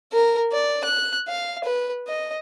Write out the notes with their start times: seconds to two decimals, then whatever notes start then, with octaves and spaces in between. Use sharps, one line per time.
0.12 A#4
0.52 D5
0.85 F#6
1.28 F5
1.64 B4
2.08 D#5